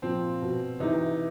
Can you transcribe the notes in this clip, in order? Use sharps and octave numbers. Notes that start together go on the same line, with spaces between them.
A#2 F3 C4
B2
C3 E3 D#4